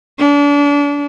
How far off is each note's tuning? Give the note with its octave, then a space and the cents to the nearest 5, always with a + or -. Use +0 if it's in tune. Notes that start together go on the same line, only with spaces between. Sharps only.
D4 -35